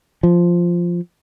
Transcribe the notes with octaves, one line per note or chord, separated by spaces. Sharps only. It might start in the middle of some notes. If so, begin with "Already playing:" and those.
F3